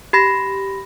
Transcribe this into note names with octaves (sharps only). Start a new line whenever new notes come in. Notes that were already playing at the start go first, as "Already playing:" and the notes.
G4 B5 A#6